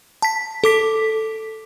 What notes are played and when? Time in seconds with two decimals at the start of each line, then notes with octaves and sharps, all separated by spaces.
0.22 A5 B6
0.64 A4 D6 B6